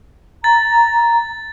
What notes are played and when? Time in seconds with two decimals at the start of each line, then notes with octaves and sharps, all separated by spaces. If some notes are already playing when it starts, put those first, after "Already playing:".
0.44 A#5 A6